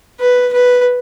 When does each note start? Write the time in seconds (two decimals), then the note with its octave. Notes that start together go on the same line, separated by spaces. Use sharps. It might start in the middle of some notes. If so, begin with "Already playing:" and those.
0.20 B4
0.53 B4